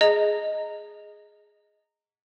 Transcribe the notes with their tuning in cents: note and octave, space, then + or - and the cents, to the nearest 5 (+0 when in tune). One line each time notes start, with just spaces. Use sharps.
G#4 +0 D#5 +0 A#5 -15